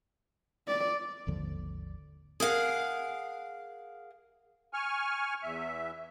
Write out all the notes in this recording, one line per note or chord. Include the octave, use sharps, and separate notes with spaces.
D5
G#1 D#2 D3 F3
G#4 A#4 F5 F#5
G#5 C#6 F6
E2 E5